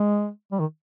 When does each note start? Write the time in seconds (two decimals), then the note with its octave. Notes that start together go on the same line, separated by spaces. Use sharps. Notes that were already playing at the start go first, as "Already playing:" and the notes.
Already playing: G#3
0.52 G3
0.59 D#3